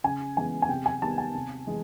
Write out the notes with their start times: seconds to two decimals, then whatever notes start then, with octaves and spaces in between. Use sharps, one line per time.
0.04 C#3 G#5
0.37 E3 G#3 B3 G#5
0.62 G#5
0.69 C3 G5
0.86 G#5
1.02 D#3 G3 B3 A5
1.18 G#5
1.34 C3
1.67 E3 G#3